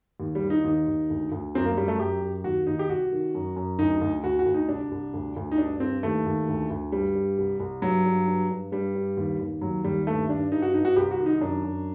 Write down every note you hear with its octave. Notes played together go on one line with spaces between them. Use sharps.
D#2
G3
D#2
D#4
D#2 D#4
D#2
D2
D2
F#2 C4
A#3
F#2 G3
A3
F#2 G4
F#2
D#2 F#4
D#2 D#4
G4
C2 F#4
D#3
F#2
F#2
D2 D#4
D2
D2 F#4
F#4
D2
D#4
C2 D4
C2
D2
D2
D#4
G2 D4
G2 C4
D#2 A3
D#2
D2
D2
G2 G3
G2
C2
C2
G2 F#3
G2
G2
G2
G2 G3
G2
D#2
D#2
D#2 F#3
D#2 G3
G2 A3
G2 D4
G2 D#4
F#4
G2 D#4
F#4
C2 G4
F#4
D#3
D#4
F#2 D4
F#2